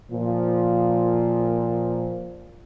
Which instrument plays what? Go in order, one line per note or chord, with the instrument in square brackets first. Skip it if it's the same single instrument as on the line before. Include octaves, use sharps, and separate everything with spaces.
[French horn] A#2 [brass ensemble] F3